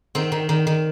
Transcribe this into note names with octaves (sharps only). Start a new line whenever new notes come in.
D#3 C4
D#3
D#3
D#3